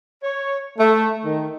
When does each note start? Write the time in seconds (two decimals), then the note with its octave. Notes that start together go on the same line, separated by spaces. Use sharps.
0.24 C#5
0.78 A3
1.25 D#3